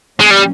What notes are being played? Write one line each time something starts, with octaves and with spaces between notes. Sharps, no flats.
A#2 F#3 G#3 A#3 C#4
G3